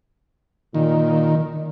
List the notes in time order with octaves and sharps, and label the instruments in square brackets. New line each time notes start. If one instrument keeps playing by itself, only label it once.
[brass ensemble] A#2 [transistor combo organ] D#3